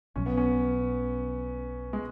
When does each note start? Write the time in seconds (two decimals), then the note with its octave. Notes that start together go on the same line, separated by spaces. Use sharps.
0.16 B1 B2 F#3 C#4
0.26 B3
0.37 C#4
1.93 G#3